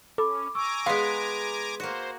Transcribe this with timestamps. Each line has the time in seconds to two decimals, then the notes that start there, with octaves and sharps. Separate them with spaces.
0.18 C#4 A4 B5 D6
0.55 G#5 A#5 C#6 D6 E6
0.86 G#3 B3 F5 C6 B6
1.80 A#3 F#4 C5